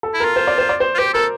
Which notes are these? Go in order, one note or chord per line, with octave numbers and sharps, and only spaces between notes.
A4
E4
F4 A#4
C5
D5
C5
D5
C5
F4
G4 C5
A4 A#4